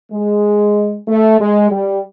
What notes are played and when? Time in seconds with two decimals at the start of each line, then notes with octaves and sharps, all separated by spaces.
0.12 G#3
1.07 A3
1.39 G#3
1.71 G3